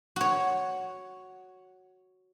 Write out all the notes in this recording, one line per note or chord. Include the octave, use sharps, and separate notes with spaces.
F#4 C#5